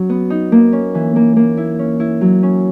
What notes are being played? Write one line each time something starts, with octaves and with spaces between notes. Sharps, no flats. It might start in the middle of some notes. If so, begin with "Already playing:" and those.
Already playing: F#3 C#4
B3
D#4
A#3
C#4
E3
A#3
A#3
E4
C#4
E4
F#3
C#4